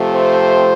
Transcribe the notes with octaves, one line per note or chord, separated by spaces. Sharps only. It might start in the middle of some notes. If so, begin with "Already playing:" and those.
Already playing: C3 F3 A3 C4
C5